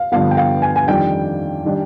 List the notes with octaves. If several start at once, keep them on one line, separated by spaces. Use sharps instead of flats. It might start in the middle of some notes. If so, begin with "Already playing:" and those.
Already playing: F5
G2 D3 F3 B3 F5
G5
F5
G#5
G#5
F2 D#3 G3 D4 G5
D#3 G3 D4